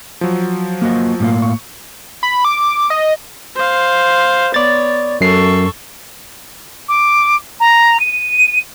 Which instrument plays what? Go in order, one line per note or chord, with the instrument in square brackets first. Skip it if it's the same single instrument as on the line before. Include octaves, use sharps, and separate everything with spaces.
[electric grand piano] F3 F#3
[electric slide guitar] A#3 F#4 D#5
A2 A#3 F5
[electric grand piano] C#6
[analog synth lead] B5
D6
D#5
[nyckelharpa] C5 F5
[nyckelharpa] B3 C#5 [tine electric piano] D5 A6
[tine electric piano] F#2 C7 [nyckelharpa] A4 C#6
[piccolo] D6
A#5
D#7